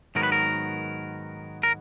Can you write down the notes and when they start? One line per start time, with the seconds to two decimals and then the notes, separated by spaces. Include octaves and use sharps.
0.15 G#2 D#3 F#3 B3 A#4
0.23 B4
0.32 A#4
1.63 A#4